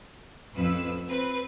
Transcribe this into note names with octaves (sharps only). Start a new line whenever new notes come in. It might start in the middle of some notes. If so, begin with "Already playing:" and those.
A1 F2 B4 E6
C4 B4